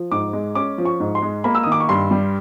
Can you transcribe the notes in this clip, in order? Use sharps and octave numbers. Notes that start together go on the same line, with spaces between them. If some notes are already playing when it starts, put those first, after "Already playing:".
Already playing: F3
G#2 D6
G#3
C#4 D6
F3
C#6
G#2
C6
G#3
A#3 B5
E6
D#6
D#3
D6
C#6
G2 C6
G3